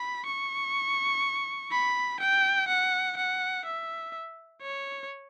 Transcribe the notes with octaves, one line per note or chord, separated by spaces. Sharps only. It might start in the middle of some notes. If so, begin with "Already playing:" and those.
Already playing: B5
C#6
B5
G5
F#5
F#5
E5
C#5